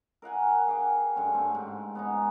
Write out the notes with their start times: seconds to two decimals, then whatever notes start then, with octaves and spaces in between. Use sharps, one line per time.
0.22 A#4 F5 F#5 G#5
0.68 G#4 F5 G5 D6
1.16 G2 D3 C#4
1.34 A3 C4 G4
1.55 G#2
1.95 B3 C#4 D#4